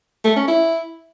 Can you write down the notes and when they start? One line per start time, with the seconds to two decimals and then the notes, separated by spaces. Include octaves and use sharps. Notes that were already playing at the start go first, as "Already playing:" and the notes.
0.25 A3
0.36 C#4
0.48 E4